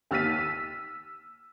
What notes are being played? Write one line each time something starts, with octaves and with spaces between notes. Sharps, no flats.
D#2 E6 F6 A6 B6 D#7
E6